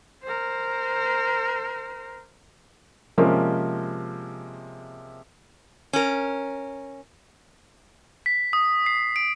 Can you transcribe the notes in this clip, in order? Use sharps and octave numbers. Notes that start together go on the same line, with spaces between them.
A#4 C5
C3 F3 G#3 A#3 C#4
C#4 A#4
B6
D#6
C7
D7